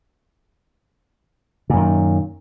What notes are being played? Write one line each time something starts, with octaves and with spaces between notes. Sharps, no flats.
F#2 A#2 D#3